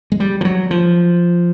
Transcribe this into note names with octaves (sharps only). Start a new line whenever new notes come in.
G#3
G3
F3
F#3
F3